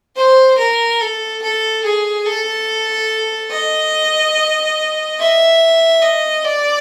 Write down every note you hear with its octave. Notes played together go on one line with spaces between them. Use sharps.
C5
A#4
A4
A4
G#4
A4
D#5
E5
D#5
D5